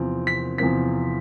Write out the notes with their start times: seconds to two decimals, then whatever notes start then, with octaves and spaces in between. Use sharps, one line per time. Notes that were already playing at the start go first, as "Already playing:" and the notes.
Already playing: E2 C3 F3 C4 F4
0.27 B6
0.58 E2 C3 F3 C4 F4 B6